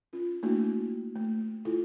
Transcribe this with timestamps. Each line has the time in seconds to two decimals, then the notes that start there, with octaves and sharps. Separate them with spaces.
0.13 C#4 F4
0.43 A3 A#3 D4 E4 F#4
1.16 A3
1.65 E4 F4 A4